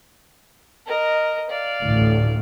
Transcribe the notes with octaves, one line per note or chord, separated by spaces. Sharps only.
A#4 D#5
D5 F5
A1 D2 A2